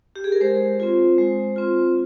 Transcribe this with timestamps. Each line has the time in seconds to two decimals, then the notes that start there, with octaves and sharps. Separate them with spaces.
0.16 G4
0.24 G#4
0.32 A#4
0.41 G#3 C5
0.80 C4 F4
1.18 G#3
1.56 C4 F4